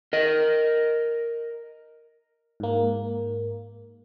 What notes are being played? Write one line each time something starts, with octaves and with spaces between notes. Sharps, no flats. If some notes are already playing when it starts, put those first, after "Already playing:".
A#4 D#5
G#2 A#3